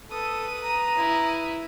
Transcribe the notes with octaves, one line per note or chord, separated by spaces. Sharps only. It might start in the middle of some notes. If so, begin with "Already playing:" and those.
A4 B4 D#6
A#5
E4